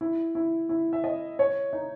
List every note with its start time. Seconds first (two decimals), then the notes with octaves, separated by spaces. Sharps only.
0.01 E4
0.35 E4
0.69 E4
0.93 E5
1.04 D#5
1.39 C#5
1.73 D#4